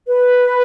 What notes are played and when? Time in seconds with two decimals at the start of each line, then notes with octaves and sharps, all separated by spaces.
0.07 B4